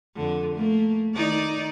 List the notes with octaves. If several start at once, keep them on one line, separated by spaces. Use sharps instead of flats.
F2 D3
A3 A#3
D#3 D#4 D5